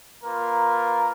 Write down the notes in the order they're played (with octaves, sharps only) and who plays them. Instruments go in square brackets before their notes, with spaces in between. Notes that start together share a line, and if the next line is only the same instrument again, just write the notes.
[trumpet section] A#3 F4 A#4 B4